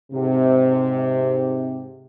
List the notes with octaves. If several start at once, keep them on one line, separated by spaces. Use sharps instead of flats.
G#2 C3